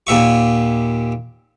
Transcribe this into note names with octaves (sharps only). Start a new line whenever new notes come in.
D#2 A#2 E5 C#6